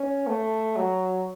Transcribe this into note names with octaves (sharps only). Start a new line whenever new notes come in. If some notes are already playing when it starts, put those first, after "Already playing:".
Already playing: C#4
A3
F#3